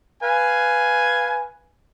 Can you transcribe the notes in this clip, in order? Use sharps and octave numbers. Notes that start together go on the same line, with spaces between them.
B4 F5 G#5